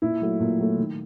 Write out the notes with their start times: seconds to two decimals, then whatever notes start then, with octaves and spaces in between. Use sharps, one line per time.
0.02 A#2 E4
0.22 F#3 A3
0.40 A#2
0.59 F#3 A3
0.78 D#3